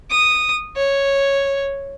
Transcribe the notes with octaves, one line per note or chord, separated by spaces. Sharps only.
D#6
C#5